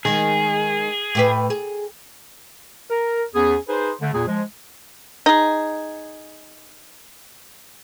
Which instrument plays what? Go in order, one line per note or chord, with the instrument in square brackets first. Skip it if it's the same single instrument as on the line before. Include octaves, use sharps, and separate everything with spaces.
[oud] D#3 G#3 [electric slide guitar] G#4
[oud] A2 G4 B4
G#4
[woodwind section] A#4
E2 B3 C#4 G#4
D#4 G#4 B4 C5
D3 A3
E2 A#2 G#4
F3 G#3
[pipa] D#4 G#4